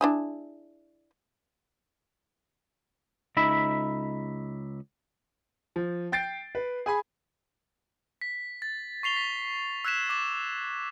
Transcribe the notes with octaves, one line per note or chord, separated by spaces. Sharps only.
D4 E4 G#4
C#2 D#4 E5 B5
F3
G5 G6 A6 C7 D7
B4
G#4 G#5 B5
B6
A6
C#6 C7 F7 G7
B6
E6 F#6 G#6 B6 E7
D6 A6 E7